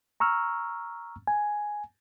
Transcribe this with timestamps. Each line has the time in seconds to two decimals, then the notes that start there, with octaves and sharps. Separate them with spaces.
0.20 A#5 C#6 E6 F6
1.27 G#5